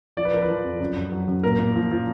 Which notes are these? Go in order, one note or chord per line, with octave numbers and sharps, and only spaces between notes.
F3 D5
B4
F3 A#4
B4
F3
F2
F#2
F#2
F#3
F#2
A#2 A#4
A#2
F3
F3